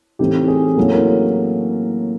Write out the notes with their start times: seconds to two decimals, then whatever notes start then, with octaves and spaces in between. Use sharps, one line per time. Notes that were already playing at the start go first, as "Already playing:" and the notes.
0.19 A2 E3 A3 C4 D#4 G4
0.48 G#4
0.77 A2 F#3 A#3 C#4 E4 A4
0.91 A#4